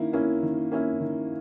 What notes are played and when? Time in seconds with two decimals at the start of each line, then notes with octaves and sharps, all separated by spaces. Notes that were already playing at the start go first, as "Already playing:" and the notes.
Already playing: D#3 A#3 C#4 E4
0.13 A#3 C#4 E4
0.43 D#3
0.72 A#3 C#4 E4
1.00 D#3